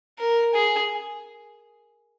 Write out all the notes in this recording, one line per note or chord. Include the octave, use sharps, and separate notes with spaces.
A#4
G#4